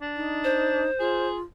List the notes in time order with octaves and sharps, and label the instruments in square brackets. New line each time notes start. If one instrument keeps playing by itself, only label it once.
[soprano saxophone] D4
[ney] D#4
[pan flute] C5
[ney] F4 [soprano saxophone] G#4